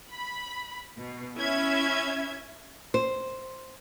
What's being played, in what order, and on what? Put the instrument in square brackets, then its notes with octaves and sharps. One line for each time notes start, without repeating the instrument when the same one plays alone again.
[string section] B5
B2
C#4 E4 E5 G#6
[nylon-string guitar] C5